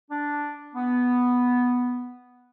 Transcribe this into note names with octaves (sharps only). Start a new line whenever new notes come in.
D4
B3